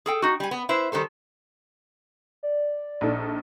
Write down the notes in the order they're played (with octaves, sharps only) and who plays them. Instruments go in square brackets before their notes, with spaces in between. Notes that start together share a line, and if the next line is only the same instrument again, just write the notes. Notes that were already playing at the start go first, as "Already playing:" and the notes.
[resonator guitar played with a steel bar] G#4 A4 G5
D#4 F#4
G3 G#5
B3
E4 B4 C5 E5
D#3 G3 A4 C5
[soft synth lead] D5
[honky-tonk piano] A#1 D#4 A4